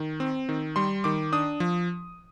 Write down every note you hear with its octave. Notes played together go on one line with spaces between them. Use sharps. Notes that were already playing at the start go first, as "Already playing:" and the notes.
Already playing: D#3
C4
D#3
G3 C6
D#3 D6
D4 D#6
F3